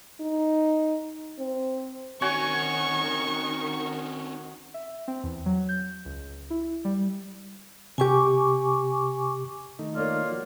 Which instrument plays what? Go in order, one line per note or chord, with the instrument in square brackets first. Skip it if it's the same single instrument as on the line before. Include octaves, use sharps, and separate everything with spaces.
[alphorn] D#4
C4
[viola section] D#3 [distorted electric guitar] C4 C#4 [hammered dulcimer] F#4 C#5 G#5 [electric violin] C#6
[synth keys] E5
C4
E2
F#3
G6
C#2
E4
G3
[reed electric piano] C3 G4 [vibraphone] G#5 C#6 D6
[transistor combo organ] D#3 A3 D#4
[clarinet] A#3 [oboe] F4 [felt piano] A#4 C#5 D5
[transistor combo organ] F3 F#4